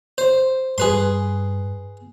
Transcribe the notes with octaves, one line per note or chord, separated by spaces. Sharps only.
C5
G2 G#4 B4 C6